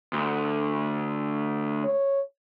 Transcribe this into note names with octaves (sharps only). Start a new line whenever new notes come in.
D2
C#5